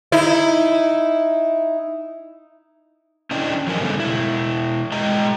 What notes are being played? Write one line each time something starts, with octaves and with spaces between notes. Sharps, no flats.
D#4 E4
C#4 D4 E4 D#5 G5
A2 F3 F#3 A#4 D#5 G#5
G2 C#3 G3 A3 B3 D#4
B2 E4
G#3 D#5 G5 A#5